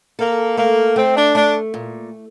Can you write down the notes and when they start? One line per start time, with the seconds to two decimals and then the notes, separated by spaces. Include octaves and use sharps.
0.19 A#3 A4
0.57 A3 A#3
0.96 A3 C4
1.16 D4
1.35 A3 D4
1.74 A#2